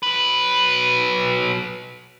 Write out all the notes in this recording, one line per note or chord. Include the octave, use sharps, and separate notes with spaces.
F#3 B4